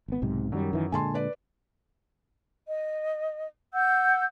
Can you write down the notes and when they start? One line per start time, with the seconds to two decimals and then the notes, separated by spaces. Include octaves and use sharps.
0.08 G#1 B3
0.22 B1 G#2 C3
0.52 F#2 D#3 F#3 G3
0.73 D#3 E3
0.92 A#2 D3 G#3 G#5 A5 C6
1.14 B4 D5
2.66 D#5
3.73 F#5 E6 G6